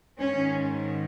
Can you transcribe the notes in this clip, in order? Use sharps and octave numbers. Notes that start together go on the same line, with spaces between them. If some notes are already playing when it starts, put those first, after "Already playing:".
G#2 D#3 C#4